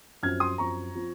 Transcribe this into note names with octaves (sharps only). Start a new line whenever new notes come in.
F#2 F3 C4 F6 G#6
C6 D#6
F#2 F3 C4 A#5 C#6
F3 C4